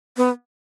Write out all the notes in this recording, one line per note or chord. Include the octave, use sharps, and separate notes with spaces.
B3